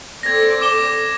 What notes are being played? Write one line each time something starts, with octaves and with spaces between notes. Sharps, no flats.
C4 A4 D5 G#6 A#6
D6 E7 G7